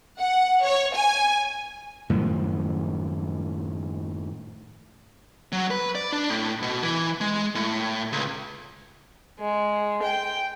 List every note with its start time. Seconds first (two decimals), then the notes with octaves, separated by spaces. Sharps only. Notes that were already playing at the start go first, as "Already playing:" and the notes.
0.19 F#5
0.64 C#5
0.96 G#5
2.09 F#2 A2 D#3 F3
5.52 F#3
5.71 B4
5.95 D5
6.13 D4
6.30 A2
6.62 B2
6.83 E3
7.21 G#3
7.55 A2
8.12 C#2
9.39 G#3
10.03 G5